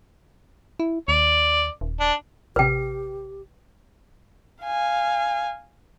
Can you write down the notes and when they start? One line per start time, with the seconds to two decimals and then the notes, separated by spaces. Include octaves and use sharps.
0.80 E4
1.08 D#2 D5
1.81 D#1
2.00 D4
2.56 A1 C3 G4 B4 G5
4.63 F5 G#5